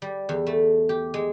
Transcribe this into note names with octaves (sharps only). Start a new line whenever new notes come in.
G3
E2
A3
G4
G#3